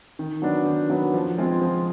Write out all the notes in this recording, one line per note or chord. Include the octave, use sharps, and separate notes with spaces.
D#3
F#3 B3 D4
D#3
F#3 B3 D4
F3
G#3 C4 F4
F3